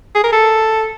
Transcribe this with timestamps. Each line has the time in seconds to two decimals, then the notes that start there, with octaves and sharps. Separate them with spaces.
0.15 G#4
0.24 A#4
0.32 A4